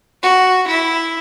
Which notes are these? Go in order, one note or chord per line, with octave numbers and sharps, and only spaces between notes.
F#4
E4